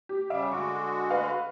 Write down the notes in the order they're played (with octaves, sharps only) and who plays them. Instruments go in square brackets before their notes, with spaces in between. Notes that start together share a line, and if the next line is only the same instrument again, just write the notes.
[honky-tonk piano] G4
[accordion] C#3 G3 [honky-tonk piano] E5 F5 D6
[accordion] D3 G#3 F#4 [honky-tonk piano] C#6 D6
[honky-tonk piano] B4 F5